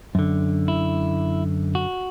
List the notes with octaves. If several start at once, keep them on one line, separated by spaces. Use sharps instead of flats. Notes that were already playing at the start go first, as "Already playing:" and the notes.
F#2 D3
E4
F#4